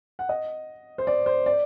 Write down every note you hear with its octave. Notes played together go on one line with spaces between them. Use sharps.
F#5
D#5
C5
D5
C5
D5